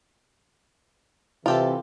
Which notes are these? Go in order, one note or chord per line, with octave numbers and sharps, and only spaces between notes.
C3 E3 F4 G4 A4